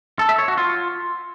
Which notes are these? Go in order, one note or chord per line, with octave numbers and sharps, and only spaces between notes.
A4
E5
C#5
F#4
F4